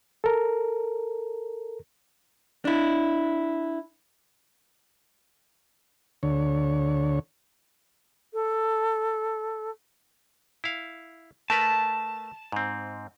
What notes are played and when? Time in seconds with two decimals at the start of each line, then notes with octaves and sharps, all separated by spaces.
0.24 A4 A#4
2.65 D4 E4
6.23 D2 D3 C#5
8.34 A4
10.64 E4 F5
11.50 A3 A#4 B4 A5
12.52 G#2 C4